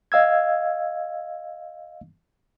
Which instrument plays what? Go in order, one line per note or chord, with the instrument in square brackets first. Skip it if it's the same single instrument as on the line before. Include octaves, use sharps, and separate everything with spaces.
[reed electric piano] D#5 F5 E6 G#6